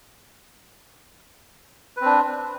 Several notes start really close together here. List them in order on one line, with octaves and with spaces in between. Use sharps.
B4 C4 D4